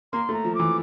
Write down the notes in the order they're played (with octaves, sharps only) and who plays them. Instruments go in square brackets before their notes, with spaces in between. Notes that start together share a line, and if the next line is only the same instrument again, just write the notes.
[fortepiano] A#3 [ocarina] C6
[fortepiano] A3
[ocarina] A#5
[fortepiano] F3
[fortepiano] E3 [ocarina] D6